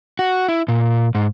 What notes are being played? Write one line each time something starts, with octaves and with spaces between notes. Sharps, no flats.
F#4
E4
A#2
G#2